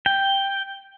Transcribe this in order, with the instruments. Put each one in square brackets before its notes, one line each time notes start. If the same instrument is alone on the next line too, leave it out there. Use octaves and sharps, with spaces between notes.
[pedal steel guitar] G5